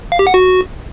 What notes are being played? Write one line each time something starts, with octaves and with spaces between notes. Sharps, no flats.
F5
G4
F#5
F#4